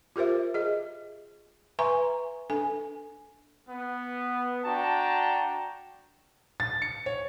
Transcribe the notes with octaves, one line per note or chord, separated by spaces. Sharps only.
F4 G4 A#4 C5 E5
G#4 D#5
B4 E5 G#5 A#5 C6 C#6
D4 A4 G#5
B3
D4 F#4 G5 A5 A#5
A6
C#7
C#5